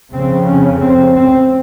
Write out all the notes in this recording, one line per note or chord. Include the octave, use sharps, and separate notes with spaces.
F2 C#3 C4
C#4
C4
C4